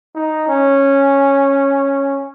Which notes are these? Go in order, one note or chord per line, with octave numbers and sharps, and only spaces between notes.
D#4
C#4